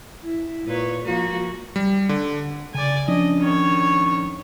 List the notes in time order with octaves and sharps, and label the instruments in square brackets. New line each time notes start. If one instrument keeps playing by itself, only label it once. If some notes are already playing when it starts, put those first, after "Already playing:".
[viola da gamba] E4
A#2 B4 C#5
F3 A#3 F#4
[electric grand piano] G3
D3
[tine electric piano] C#3 [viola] D5 G#5
[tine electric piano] F3 C#4 D4 [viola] D#5
[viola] D#3 C#5